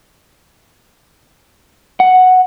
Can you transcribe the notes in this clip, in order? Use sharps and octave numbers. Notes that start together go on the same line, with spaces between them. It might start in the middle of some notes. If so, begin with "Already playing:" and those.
F#5